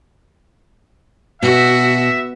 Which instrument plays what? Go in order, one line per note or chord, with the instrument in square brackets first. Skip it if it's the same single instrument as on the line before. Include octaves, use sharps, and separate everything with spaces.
[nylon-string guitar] B2 [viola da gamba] F#4 [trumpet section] E5